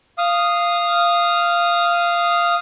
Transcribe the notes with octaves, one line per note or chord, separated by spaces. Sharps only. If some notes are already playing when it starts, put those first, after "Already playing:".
F5 D#6